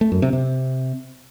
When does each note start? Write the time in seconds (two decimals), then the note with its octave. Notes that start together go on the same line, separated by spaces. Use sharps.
0.01 A3
0.12 F#2
0.22 C3
0.33 C3